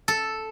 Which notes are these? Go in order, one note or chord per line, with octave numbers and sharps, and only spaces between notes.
A4